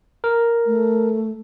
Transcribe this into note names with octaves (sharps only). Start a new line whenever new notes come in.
A#4
A3